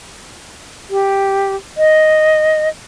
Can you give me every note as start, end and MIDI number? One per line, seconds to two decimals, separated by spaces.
0.90 1.55 67
1.77 2.69 75